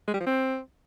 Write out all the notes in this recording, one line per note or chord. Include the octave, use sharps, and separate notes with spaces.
G#3
G3
F3
C4